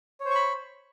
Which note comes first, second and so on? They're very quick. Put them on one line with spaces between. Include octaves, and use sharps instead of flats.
C#5 C5 C#6 B5